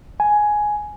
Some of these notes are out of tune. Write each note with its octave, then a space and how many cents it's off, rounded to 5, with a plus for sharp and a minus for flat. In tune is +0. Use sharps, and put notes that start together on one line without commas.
G#5 +10